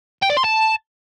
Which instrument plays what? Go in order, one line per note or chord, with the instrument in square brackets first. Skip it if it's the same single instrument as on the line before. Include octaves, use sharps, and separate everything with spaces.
[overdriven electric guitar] G5
D5
C6
A5